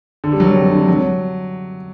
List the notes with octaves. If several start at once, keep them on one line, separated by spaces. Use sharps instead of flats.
D3
G3
F#3
C3
D3
F#3